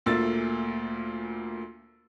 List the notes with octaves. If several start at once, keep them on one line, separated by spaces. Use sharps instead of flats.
D2 A#2 A3 A#3 E6 A6